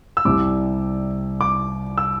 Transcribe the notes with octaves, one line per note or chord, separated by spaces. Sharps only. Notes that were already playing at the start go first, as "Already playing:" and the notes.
E6
C2 C3 G3 D6
D6
E6